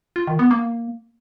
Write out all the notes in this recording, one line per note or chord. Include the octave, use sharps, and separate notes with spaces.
F4
D#3
B3
A#3